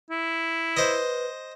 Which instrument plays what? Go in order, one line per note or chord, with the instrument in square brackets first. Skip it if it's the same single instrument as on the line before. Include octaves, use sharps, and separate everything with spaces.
[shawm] E4
[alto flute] B4 [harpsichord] C5 D#5